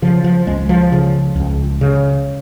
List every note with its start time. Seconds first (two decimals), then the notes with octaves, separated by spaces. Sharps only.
0.02 C#3 F3
0.24 F3
0.47 C#2 G#3
0.69 F3
0.92 C#3
1.36 C#2
1.81 C#3